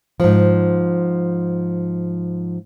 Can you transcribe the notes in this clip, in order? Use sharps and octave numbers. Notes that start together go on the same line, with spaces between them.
G#2 F3